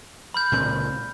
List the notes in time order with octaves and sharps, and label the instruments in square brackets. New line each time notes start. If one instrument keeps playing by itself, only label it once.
[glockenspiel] B5 F6 G6
[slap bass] C#2 A#2 C4